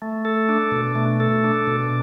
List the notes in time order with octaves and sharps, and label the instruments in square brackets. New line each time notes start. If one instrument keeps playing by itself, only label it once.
[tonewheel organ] A3
A4
D4
B2
A3
A4
D4
B2